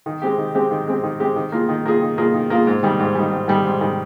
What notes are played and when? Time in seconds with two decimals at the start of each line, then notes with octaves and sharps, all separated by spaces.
0.06 D#3
0.22 G#3 C4 G4
0.38 D#3
0.55 G#3 C4 G4
0.71 D#3
0.87 G#3 C4 G4
1.03 D#3
1.20 G#3 C4 G4
1.36 D#3
1.52 A#3 F4 G#4
1.69 D#3
1.85 A#3 F4 G#4
2.02 D#3
2.18 A#3 F4 G#4
2.34 D#3
2.50 A#3 F4 G#4
2.67 G#2
2.83 D#3 G3
2.99 G#2
3.15 D#3 G3
3.31 G#2
3.48 D#3 G3
3.64 G#2
3.81 D#3 G3